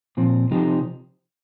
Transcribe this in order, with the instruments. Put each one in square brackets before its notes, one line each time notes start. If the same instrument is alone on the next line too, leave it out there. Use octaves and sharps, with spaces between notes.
[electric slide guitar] A#2 F3 C4
C3 F3 C4 D#4 G4